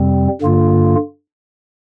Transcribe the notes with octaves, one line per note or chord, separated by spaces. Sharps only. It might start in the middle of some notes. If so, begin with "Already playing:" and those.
Already playing: F2 C3 G3 C4
G2 D3 A#3 F4